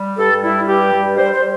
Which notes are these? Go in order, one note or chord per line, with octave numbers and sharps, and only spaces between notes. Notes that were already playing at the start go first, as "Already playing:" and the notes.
Already playing: G3
G2 A4
G3 E4
G2 G4
G3
G3 C5
C5
G3